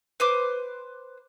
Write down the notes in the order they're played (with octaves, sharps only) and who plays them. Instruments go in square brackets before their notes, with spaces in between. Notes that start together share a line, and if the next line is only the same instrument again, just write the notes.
[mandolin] B4 C5 D6